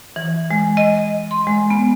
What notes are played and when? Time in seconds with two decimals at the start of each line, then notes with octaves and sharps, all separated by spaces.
0.16 E3
0.51 G#3
0.77 D#5
1.31 C6
1.47 G#3
1.70 B3